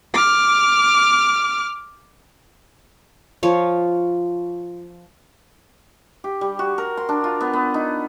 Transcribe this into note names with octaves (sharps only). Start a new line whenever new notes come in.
D6 F6
F3 F4 C#5
G4
G3
F#4
A#4
C6
D4
F4
B3
B3
D#4